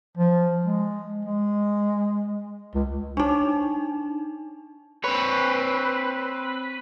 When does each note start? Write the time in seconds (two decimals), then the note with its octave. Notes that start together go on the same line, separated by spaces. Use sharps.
0.17 F3
0.65 G#3
1.25 G#3
2.75 C#2
3.17 D4 D#4
5.04 C4 B4 C#5